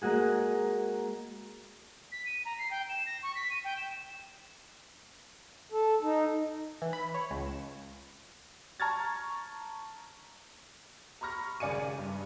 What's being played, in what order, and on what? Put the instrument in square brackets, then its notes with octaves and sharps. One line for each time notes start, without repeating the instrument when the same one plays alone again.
[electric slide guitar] G#3 A#3 F#4 G#4
[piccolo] B6
D#7
A#5
C7
G5
E7
A#6
C#6
B6
D#7
G5
E7
[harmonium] A4
D#4
[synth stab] E3
B5
C#5
C#2
E7
[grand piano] A5 A#5 C#6 F6 G#6 A6
[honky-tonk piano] A#5 B5 C#6 F6 A#6
G#1 C#3 D5 G#5 C#7 D#7
G2